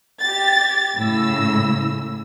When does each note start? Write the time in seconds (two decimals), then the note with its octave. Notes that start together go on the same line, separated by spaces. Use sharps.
0.21 G4 A6
0.99 A2 C#3 E6